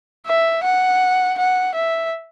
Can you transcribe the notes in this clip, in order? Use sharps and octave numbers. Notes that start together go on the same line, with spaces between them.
E5
F#5
F#5
E5